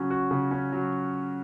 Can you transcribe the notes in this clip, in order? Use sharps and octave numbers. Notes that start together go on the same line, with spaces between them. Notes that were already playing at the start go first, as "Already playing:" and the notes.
Already playing: C#3 F#3 C#4 F#4
F#4
C#3
C#4
F#3